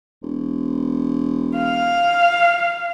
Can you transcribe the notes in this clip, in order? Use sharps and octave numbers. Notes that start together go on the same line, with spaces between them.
E1
F5